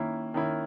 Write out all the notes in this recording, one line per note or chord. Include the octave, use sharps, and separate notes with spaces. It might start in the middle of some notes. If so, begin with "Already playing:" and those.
Already playing: D#3 A#3 C#4 E4
D#3 A#3 C#4 E4